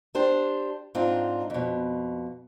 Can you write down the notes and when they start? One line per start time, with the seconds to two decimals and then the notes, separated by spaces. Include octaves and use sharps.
0.15 D4 G4 C5
0.95 G#2 C4 D4 D#4 F4
1.50 F2 B2